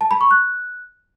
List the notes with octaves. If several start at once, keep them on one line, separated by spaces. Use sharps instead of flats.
A5
B5
C#6
F#6